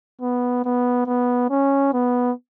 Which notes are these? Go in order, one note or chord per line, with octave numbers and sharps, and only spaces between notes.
B3
B3
B3
C#4
B3